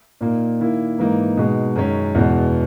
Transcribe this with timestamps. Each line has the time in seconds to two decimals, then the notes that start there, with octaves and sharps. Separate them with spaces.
0.21 A#2 A#3 D#4
0.60 D#3 A#3 E4
0.98 G#2 E3 A#3 D#4
1.37 B2 G#3 D#4
1.76 F#2 D#3 G#3 C#4
2.15 E2 B2 G#3